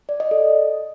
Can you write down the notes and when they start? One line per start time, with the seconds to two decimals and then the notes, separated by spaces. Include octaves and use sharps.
0.09 D5
0.20 D#5
0.31 A4